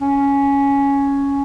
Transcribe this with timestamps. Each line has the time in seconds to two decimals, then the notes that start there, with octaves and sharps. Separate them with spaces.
0.01 C#4